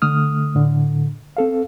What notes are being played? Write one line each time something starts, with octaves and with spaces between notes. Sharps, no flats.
D3 A3 D#6 F6
A2 D3
C4 A4 F5